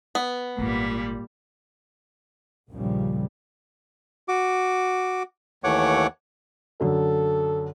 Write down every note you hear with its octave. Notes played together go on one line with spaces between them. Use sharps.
B3
G#1 A#2 C#3 G3
A#1 D#2 A#2 C#3 F3 G3
F#4 D6
D#2 E3 A3 C#5 F#5 D6
F#2 D3 A4